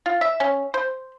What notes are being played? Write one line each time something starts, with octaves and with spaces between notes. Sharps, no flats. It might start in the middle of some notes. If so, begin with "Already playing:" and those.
F4
E5
C#4
C5